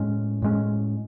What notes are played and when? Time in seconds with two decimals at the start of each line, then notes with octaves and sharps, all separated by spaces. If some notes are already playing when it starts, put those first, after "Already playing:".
Already playing: A2 G#3 C#4
0.42 A2 G#3 C#4